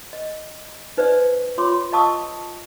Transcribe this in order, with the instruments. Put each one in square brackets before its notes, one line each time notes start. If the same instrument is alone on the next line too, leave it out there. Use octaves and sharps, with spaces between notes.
[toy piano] D#5
D#4 B4 C5 D5 E5
F4 C#5 E5 C6 D6
D#5 F5 A5 C#6 D#6 E6